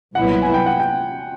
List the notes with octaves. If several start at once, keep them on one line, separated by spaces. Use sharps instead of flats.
C2 A#2 F#3 B3 E4 F#5
G#5
G5
F#5
G5